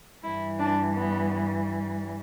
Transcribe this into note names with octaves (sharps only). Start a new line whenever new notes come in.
G2 E3 G3 E4
D4
B3